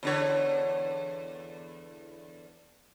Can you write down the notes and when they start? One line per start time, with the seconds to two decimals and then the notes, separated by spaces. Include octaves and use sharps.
0.03 E2 D3 C#5